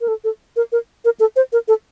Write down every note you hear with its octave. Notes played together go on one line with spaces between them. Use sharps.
A#4
A4
A4
A#4
A#4
A#4
A4
C5
A#4
A4